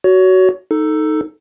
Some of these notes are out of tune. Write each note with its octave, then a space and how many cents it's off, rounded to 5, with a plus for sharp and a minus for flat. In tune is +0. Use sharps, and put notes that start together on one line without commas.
F#4 +15 C#5 +25
D#4 +0 A4 +5